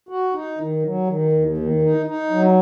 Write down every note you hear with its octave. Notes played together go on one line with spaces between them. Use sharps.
F#4
D#4
D#3
F#3
D#3
D#2
D#3
D#4
D#4
F#3